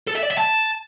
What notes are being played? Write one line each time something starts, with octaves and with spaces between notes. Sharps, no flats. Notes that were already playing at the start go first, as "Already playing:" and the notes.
A4
E5
D5
E5
A5